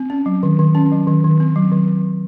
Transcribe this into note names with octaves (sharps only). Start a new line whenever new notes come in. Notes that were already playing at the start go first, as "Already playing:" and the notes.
Already playing: C4
C#4
F#3
D#3
D#3
C#4
F#3
D#3
D#3
C4
F#3
D#3